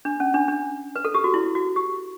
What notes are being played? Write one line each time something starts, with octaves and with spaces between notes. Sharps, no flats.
D4
C#4
D4
D4
B4
A4
G4
F#4
E4
F#4
G4